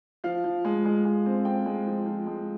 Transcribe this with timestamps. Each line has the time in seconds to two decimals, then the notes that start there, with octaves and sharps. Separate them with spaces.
0.24 F3 F5
0.44 F3
0.65 G#3
0.85 G#3
1.05 G#3
1.26 C4
1.45 C4 G5
1.66 G#3
1.86 F3
2.06 F3
2.27 G#3